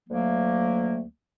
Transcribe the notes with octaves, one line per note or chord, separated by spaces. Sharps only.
D2 F#3 A3 A#3